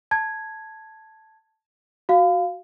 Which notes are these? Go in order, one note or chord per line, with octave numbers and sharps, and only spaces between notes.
A5 G#6
F#4 F5